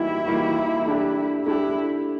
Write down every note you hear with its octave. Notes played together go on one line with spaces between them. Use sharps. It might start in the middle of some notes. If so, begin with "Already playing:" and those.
Already playing: E3 G3 A#3 D#4 E4 F#4
E3 G3 A#3 D#4 F#4
A3 D4 G4
A3 D4 E4 G4